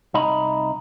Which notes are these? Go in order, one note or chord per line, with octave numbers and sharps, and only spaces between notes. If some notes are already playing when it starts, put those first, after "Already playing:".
C2 D#4 D#5 A#5 B5